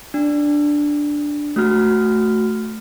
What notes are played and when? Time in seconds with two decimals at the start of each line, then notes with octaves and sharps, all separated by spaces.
0.14 D4
1.56 A3 F#4 F6